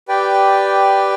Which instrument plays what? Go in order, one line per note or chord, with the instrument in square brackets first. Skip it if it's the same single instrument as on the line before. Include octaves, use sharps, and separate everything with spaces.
[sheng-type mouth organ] G4 B4 D5 G5